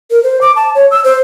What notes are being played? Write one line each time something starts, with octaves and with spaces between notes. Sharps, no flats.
A#4
C5
D6
A5
C#5
E6
C5